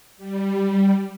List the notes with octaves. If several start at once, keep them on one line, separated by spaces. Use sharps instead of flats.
G3